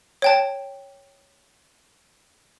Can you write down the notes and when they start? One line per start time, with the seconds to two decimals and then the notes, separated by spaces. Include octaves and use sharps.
0.22 C#5 G5 A5